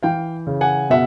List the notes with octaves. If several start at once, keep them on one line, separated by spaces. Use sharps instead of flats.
E3 F5 G5
C#3
F#5 G#5
B2 E5 F#5